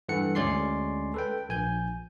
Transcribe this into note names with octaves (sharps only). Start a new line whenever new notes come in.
G2 E3 A4 F#5 C#7
D2 G#3 C#4 D5 C6 C7
A4 B4 G5
A#1 G#5 G6